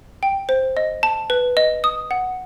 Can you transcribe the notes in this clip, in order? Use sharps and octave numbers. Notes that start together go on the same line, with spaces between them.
G5
C5
D#5
A5
B4
D#5
D#6
F#5